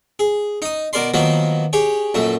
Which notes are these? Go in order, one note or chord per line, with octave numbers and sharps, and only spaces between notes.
G#4
D#4 D#6
B2 A#4 D5 C6
D#3 F3 F#3 A#3 B3
G4 G#4 C#5
A#1 F#2 A3